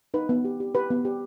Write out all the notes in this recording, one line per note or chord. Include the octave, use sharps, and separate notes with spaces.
D#4 B4
B3
G4
G4
G4 B4
B3
G4